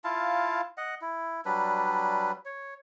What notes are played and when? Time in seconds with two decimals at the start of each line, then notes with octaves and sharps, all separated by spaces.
0.04 E4 F4 F5 A5
0.77 D#5 F#5
1.01 E4
1.45 F#3 G3 D4 B4
2.45 C#5